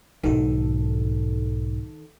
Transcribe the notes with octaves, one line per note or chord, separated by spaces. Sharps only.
B1 G#2 D#3 A4